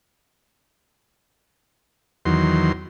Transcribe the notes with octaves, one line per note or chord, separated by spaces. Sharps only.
E2 D#3 F#3 C6